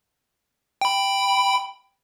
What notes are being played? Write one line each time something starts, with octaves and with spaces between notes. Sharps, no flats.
G5 B5